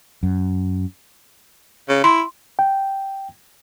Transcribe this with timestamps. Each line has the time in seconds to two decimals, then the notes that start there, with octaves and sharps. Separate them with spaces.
0.23 F#2
1.89 C#3
2.04 E4 C6
2.59 G5